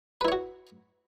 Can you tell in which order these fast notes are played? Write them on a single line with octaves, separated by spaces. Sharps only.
B4 E4 C#5 F#4